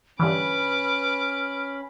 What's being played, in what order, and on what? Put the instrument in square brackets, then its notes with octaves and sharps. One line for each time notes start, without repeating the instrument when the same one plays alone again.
[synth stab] G2 D3 E3 [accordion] C#4 B5 [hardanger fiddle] B4 D6 [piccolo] F6